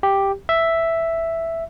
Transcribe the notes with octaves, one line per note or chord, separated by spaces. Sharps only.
G4
E5